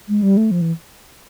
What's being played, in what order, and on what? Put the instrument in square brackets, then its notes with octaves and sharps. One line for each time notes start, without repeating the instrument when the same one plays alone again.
[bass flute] G#3
G3
A3
F3
E3